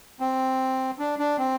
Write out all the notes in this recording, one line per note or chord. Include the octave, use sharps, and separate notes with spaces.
C4
D4
D4
C4